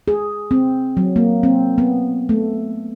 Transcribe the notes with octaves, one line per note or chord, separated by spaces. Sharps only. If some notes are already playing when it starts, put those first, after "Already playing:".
G#4
C4
F#3
A#3
C4
B3
A3